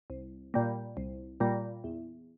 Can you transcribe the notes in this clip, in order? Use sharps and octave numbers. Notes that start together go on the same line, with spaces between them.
C2
A#2 G3 A#3
C2
A#2 G3 A#3
E2